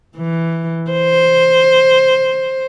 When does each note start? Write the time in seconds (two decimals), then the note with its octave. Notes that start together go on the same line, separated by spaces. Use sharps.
0.16 E3
0.91 C5